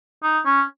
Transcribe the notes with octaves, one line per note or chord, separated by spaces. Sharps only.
D#4
C#4